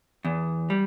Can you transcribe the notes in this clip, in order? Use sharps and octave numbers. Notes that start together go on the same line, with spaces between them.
E2
G3